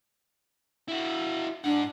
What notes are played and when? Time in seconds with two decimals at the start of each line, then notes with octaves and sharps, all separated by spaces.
0.88 E4 F#4
1.64 G#2 D4 F#5